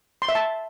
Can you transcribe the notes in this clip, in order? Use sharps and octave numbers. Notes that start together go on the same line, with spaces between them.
C6
E5
A5